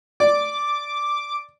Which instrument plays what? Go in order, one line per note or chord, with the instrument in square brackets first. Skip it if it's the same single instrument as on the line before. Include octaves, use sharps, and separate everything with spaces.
[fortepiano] D5 [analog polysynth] D6